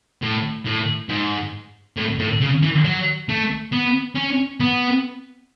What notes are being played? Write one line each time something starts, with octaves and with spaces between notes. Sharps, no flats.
A2
A2
G#2
A2
A2
C#3
E3
F#3
A3
B3
C#4
B3